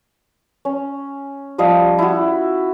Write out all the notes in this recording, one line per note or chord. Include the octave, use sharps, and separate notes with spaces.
C#4
F3 G3 D#5 F5
E4 F#4